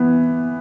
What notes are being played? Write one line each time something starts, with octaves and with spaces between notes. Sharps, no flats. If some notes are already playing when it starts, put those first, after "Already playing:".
Already playing: E3 B3